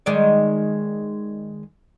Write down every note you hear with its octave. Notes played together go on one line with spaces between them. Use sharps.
D#3 G#3 D5